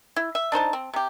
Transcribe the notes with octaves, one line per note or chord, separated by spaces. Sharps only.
E4
E5
D4 D#4 C5 A5
C4
C3 G4